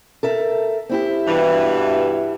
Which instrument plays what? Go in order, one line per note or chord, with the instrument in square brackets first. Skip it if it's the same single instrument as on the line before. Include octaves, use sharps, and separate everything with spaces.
[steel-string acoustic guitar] A4 A#4 E5
C4 E4 G4
[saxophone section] G2 B2 E3